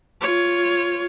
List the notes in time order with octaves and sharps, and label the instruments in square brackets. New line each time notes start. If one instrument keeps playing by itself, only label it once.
[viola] F4 C#5